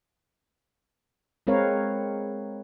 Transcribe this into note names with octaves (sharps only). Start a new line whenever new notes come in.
G#3 C4 A#4 B4 C#5 F5